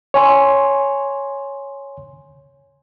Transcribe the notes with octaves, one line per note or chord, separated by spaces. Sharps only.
C#5 G#5 C6